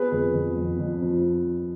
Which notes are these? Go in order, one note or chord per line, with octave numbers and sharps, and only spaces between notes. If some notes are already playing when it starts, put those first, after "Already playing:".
Already playing: B3 G#4 B4
F2
F2
F2
F2
F3